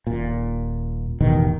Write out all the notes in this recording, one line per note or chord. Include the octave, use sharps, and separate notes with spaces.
D#1 A#2
E1 A1 B2 D#3